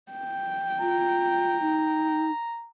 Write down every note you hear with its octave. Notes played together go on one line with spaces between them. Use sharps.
G5
F4 A#5
D#4